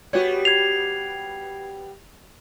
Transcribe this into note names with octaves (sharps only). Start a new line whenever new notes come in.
G3 B3 F#4 C#5
G#6 C7 F7